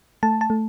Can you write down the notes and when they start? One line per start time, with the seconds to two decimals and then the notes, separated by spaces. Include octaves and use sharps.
0.23 A3 A5
0.41 A5
0.50 A3